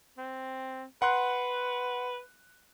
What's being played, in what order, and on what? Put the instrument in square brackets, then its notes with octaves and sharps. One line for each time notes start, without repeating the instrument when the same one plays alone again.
[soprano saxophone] C4
[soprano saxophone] B4 [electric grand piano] F#5 C6 F#6